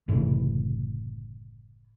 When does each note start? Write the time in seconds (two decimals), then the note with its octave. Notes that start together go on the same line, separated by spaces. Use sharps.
0.08 F#1 A2 C3 E3